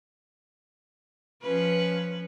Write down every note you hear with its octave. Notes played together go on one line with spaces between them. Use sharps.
F3 C#4 B4